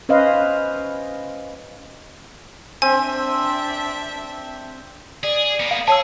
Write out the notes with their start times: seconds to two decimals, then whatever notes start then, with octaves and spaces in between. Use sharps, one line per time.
0.09 C#4 B4 C5 D#5 F5
2.82 C4 D4 E5 G#5
5.23 G#4 D5
5.60 A#3 B3
5.71 F5
5.88 G#4 C#5 A5 E6